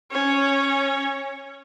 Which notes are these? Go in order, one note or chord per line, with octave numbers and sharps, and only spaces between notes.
C#4 C#5